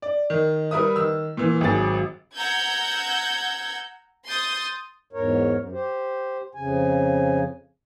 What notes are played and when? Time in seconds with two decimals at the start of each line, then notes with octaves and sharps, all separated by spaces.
0.02 D5
0.30 D#3
0.71 G3 A#4 B4 E5 D#6
0.96 D#3 E6
1.37 A#2 E3
1.61 G#1 F#3 G#4 A6
2.35 F#5 A#5 E6 G6 G#6
4.26 C6 D#6 G6 A6
5.13 E2 G#2 A#4 C#5
5.54 F#2
5.72 G4 C5
6.55 F2 C#3 G#5